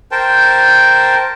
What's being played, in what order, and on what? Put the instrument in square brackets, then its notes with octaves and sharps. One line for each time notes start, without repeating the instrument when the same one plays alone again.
[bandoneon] A#4 C5 G5 A5